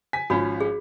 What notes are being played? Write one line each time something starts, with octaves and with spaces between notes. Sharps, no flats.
G#5 B6
G#1 F3 C#4 F#4 B5
G#4